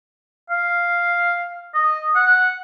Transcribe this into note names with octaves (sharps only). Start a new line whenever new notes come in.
F5
D#5
F#5